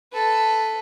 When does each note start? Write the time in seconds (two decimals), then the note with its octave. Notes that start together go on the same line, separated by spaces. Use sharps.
0.13 A4 B4